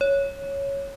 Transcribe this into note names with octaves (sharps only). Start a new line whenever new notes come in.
C#5